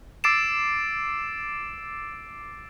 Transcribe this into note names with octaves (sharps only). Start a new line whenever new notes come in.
D6 E6 A6 C7 D7 E7